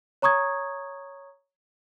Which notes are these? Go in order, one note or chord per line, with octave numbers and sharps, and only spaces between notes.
C#5 A#5 C#6 D#6 G#6